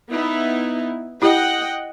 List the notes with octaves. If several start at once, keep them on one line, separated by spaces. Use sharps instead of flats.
B3 D#4 E4
E4 G4 D#5 F#5 G5